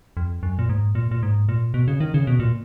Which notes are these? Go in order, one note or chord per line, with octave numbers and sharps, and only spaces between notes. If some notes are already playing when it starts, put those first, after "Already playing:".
F2
F#2
A#2
G#2
A#2
A#2
G#2
A#2
B2
C#3
D#3
C#3
B2
A#2